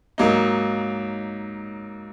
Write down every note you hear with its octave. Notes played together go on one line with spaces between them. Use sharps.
G#2 F#3 A#3 D#4